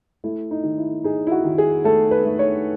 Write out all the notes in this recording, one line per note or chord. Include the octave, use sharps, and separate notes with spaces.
A3 E4
D#4
D#3
E4
D#4 G#4
E4
F#4
D#3
G#4
A3 A4
B4
A3
C#5